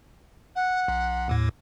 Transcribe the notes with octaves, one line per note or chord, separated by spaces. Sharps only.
F#5
B1
D#2 A2